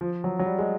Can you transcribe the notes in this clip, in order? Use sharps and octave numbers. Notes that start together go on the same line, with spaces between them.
F3
F#3
F#3
G3
G#3